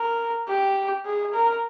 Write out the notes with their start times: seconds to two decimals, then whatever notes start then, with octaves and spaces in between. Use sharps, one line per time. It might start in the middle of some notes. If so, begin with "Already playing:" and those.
Already playing: A#4
0.49 G4
1.06 G#4
1.34 A#4